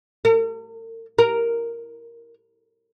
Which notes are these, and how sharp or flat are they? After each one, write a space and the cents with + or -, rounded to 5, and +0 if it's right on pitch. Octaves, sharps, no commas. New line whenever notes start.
A#4 -45
A#4 +0